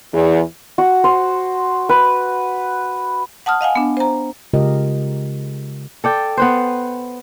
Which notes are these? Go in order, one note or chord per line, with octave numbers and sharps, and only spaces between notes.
E2
F#4
C5
B4
F#5 A5 D#6 F6
D#5 F5 F#5 G#5
B3 D4
C5 A#5
C#3 G#3 F4 G4 A#4 D#5
A4 D5 G5
B3 B4 C5